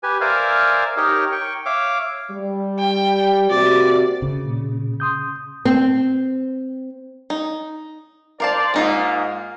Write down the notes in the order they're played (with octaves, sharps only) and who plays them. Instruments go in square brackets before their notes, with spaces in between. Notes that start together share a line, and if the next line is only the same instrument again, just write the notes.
[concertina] G4 B4 G#5
A#4 C5 D5 E5 F5 G#5
D#4 G4 A#4 C#5 D#5
G5 C#6
C#5 E5 F5 D6
[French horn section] G3
[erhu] G5
[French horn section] C3 A#3 F#4 [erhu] D5
[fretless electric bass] C#3
[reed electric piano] A#2
C6 D#6 G6
[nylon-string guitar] C4
[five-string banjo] D#4
[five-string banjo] A#4 F5 A5 [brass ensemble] C5 D5
[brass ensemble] G#2 A#3 [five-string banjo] G#3 D#4 F4